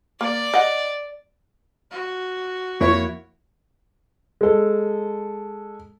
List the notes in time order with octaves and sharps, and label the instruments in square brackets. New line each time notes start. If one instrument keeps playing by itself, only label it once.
[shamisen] A#3 [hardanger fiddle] D5
[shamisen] D#5 F#5
[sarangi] F#4
[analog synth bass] F2 [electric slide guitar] A#3 E4 [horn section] C#5
[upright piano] G#3 A4